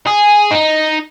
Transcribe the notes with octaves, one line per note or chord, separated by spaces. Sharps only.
G#4
D#4